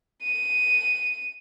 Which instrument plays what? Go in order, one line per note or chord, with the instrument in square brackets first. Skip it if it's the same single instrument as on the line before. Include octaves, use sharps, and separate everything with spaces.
[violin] D#7